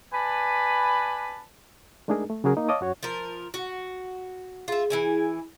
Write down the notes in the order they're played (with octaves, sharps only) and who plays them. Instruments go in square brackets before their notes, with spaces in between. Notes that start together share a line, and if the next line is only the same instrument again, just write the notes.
[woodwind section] B4 D5 G#5 A5 B5
[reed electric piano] G#3 A3 D4 D#4 G#4 A#4
A3
C#3 F#3 F#4 G#4 A#4
A#3 D#4
C#5 D#5 F5 A5 D6 D#6
F#2 F#4 C#5
[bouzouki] F3 A#4
F#4
[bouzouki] F4 E5 [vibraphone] G#4
[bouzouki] E3 E4 G#5